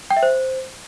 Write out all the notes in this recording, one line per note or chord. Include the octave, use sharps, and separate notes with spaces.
G5
E5
C5